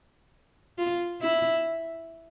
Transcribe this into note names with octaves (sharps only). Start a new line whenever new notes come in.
F4
E4